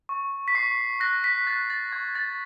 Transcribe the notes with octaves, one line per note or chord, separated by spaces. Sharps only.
C#6
B6
C#6 C7
F#6 A#6
B6
F#6 A6
A6
C#6 G#6
A6